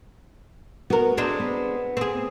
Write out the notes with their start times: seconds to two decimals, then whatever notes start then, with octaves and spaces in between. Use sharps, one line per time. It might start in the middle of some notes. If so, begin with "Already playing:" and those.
0.90 B3 F#4 A#4
1.17 G#3 C4 D4
1.40 B3
1.97 C4 G#4